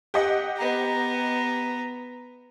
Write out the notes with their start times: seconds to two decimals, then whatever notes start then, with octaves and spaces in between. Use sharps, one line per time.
0.14 G4 D#5 F#5
0.57 B3 A#5